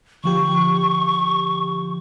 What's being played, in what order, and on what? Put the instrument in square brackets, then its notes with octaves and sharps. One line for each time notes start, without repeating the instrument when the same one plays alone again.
[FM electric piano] D3 F3 G4 [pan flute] C#6